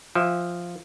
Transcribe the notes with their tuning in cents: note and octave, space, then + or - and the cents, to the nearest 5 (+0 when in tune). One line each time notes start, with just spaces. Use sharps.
F3 +0 E5 +0 G#5 -40